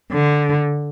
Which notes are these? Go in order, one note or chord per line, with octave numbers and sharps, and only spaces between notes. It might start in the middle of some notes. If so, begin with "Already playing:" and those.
D3